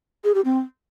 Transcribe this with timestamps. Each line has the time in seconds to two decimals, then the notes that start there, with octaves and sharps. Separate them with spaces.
0.24 G#4
0.34 G4
0.45 C4